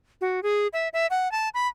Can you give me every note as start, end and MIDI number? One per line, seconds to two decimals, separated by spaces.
0.21 0.43 66
0.43 0.67 68
0.73 0.89 76
0.93 1.07 76
1.10 1.31 78
1.32 1.49 81
1.54 1.67 83